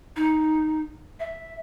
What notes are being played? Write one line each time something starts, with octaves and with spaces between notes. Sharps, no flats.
D#4
E5